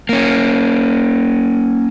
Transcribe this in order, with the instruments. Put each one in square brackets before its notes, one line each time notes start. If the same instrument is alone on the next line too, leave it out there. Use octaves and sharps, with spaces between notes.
[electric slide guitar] A#3 C#4